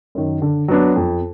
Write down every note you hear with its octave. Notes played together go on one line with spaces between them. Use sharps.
F#2 D#3
D3
F#3 B3 D4
F2